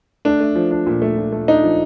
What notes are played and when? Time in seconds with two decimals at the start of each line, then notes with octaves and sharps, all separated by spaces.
0.25 A3 D4
0.40 A3
0.55 F3
0.71 D4
0.86 A#2
1.02 A3
1.18 A#2
1.32 A3
1.48 D4 D#4
1.63 F3